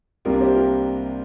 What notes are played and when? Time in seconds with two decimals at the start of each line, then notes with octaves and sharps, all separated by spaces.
0.25 C2 C3 A#3 D4 F4 A#4
0.41 G4 C5
0.55 F4 A#4